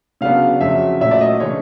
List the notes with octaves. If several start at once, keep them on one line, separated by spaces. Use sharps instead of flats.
C#3 F#3 B3 D4 F5
F2 C#3 F#3 E5
A#2 F#3 A3 C#4 E5
D5
D#5
C#3 E3 A3 D4 C#5